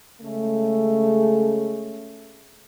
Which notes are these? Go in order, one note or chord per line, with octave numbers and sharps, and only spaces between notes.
C#3 G#3 A3